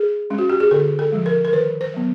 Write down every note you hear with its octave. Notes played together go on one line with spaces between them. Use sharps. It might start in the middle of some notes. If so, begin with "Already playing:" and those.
Already playing: G#4
G#3 C#4
F#4
G4
G#4
D3 A4
A4
F3 G#3
A#4
A#4
D#3 B4
C5
F#3 B3